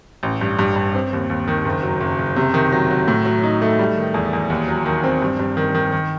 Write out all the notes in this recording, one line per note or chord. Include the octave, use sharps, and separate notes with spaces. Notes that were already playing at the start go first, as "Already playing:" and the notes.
A1
G2
G2
G2
C4
D#2
D#2
D#3
F#1
F#3
F#1
F#1
C3
D#3
F#3
F#3
A2
F#3
D#4
A3
G3
D#3
E2
E2
D#2
F#3
D#3
C4
G2
G2
D#3
D#3
D#3